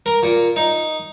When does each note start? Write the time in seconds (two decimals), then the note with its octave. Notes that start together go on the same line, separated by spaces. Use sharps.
0.06 A#4
0.23 A#2
0.56 D#4